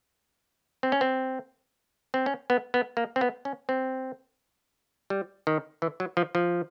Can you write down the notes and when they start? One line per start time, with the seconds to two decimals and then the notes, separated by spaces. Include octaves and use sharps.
0.83 C4
0.92 C#4
1.01 C4
2.14 C4
2.26 C#4
2.50 B3
2.74 B3
2.97 A#3
3.16 C4
3.21 B3
3.45 C#4
3.69 C4
5.10 G3
5.47 D#3
5.82 E3
6.00 F#3
6.17 F3
6.35 F3